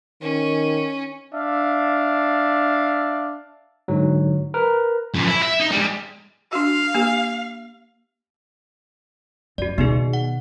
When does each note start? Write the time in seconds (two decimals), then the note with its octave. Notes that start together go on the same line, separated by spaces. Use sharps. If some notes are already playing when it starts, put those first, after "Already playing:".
0.22 D#3 C#4
1.33 D4 E5 F5
3.88 G#2 D3 F#3
4.54 A#4 B4
5.15 F#2 F3
5.27 E4
5.43 E5
5.60 D#4
5.72 G3 G#3
6.53 D4 F#4 F5
6.95 A#3 G4
9.58 F#2 F#4 D5
9.78 B2 D#3 B3 D#4 G#4
10.13 F#5